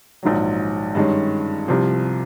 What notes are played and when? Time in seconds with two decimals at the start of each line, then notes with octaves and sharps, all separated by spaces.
0.23 A#1 G#2 D#3 F#3
0.95 G2 D#3 G#3 C#4
1.68 C2 C3 F3